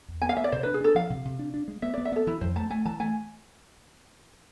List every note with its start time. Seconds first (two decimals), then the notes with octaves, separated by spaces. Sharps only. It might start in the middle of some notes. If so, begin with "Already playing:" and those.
0.08 E2
0.21 B3 G#5
0.29 F5
0.37 B3 E5
0.44 D5
0.52 C3 C5
0.63 D4 B4
0.74 G#4
0.81 D4 A4
0.95 F3 F5
1.10 C3
1.25 C3
1.39 D4
1.54 D4
1.68 G#3
1.82 B3 E5
1.94 B3 D5
2.05 E5
2.12 B3 A4
2.27 E3 E4
2.41 F2 C5
2.56 A3 A5
2.70 A3 G#5
2.85 E3 A5
3.00 A3 G#5